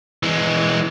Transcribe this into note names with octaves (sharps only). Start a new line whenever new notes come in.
E3 G#3